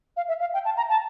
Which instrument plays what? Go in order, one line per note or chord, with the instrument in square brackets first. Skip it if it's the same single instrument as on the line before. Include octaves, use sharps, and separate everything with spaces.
[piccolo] F5
E5
F5
G5
A5
A#5
A5